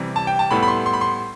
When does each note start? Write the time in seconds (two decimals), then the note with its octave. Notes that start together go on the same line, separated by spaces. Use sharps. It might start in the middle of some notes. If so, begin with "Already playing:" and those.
Already playing: C3 E3 G3
0.16 A5
0.27 G5
0.39 A5
0.51 A2 G3 B3 E4 B5
0.63 B5
0.68 C6
0.86 C6
0.93 B5
1.01 C6